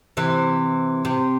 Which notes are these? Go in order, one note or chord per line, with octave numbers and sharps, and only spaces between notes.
C3 E3
C3